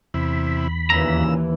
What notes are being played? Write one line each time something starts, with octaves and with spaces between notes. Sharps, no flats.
E2 C3 E4 B5
D#2 A#2 C#3 E3 A#5 E6